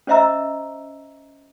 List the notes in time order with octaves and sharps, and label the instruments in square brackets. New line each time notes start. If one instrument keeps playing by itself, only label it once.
[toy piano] C#4 C5 D#5 E5 A#5 E6